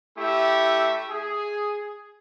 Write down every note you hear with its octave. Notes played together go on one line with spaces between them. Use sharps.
A3 E4 G4 E5
G#4